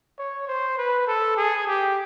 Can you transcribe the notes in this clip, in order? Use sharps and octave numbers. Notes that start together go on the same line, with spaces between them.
C#5
C5
B4
A4
G#4
G4